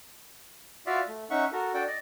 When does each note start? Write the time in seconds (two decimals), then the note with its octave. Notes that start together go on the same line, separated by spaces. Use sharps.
0.87 F4 F#4 D5 E5 F5
1.08 A3
1.30 C#4 D#4 E5 F#5 C#6
1.52 F#4 A4 A#4
1.74 D4 F#4 A4 D5 G5 D6
1.87 D5 D#5